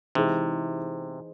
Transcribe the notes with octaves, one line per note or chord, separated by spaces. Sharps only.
C3 E3 G#3 D#4 G#4 C5